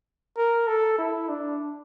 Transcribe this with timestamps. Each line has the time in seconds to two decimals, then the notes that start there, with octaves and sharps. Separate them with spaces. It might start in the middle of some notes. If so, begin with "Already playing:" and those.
0.38 A#4
0.67 A4
0.98 E4
1.29 D4